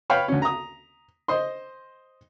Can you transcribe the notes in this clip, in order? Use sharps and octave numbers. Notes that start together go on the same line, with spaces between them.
B4 C#5 F5 G5 B5
D2 C#4
A#5 D#6
C5 D#5 C6